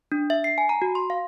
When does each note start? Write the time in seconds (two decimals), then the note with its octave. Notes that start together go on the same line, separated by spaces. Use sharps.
0.12 D4
0.30 E5
0.44 C7
0.58 G#5
0.69 A#5
0.82 F#4
0.95 C6
1.10 F5